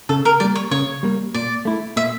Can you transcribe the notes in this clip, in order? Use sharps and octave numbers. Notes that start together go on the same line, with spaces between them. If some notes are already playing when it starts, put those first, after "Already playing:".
C#3 A4
A#4
G3 A#3 D5
C#5
C#3 C#5
G3 A#3
A#2 D5
A3 E4
A#2 E5